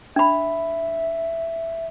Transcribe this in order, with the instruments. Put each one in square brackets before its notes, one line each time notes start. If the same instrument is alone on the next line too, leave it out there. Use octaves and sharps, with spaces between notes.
[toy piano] D4 B5 [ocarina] E5